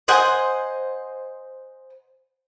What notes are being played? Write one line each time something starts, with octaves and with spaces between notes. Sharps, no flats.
C5 D#5 F#5 G#5